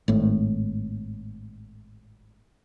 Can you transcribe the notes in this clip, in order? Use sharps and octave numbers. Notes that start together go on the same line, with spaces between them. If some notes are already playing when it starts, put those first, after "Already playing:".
G#1 A2